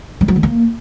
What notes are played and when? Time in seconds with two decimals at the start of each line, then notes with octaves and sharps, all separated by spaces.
0.21 G3
0.28 F#3
0.36 D#3
0.43 A#3